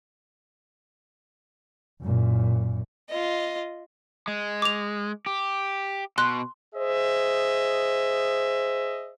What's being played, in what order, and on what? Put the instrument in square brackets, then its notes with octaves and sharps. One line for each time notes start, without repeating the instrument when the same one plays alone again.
[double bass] F#2 A#2
[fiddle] F4 D#5
[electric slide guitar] G#3
[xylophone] D6 F7
[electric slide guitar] G4
[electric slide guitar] B2 [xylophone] C6 F#6
[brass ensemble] G#4 C5 D#5 E5